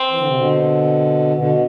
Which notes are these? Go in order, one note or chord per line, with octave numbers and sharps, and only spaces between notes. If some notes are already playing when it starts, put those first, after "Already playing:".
Already playing: C4
E3
D3
C3
B2 D3
B2 D3